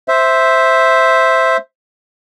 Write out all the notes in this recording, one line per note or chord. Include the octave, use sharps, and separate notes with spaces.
C5 E5